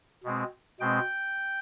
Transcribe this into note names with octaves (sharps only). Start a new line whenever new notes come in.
B2 G#3 C4
B2 G#3 C4 G5